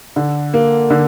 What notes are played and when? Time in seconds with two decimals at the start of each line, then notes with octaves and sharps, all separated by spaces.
0.16 D3
0.54 A#3
0.90 D3